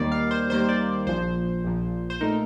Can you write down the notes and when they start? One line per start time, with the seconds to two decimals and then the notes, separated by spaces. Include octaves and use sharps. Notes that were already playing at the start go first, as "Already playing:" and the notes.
Already playing: D#2 D#3 G3 A#3 D5
0.12 F5
0.31 C5
0.50 D#2 D#3 G3 A#3 C5
0.69 D5
1.07 A#1 A#2 F3 C5
1.64 A#1 A#2 F3
2.10 C5
2.21 A#2 A3 D#4 A#4